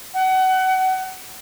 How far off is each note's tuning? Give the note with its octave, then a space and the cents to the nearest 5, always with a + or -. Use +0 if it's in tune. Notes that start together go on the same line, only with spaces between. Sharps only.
F#5 +30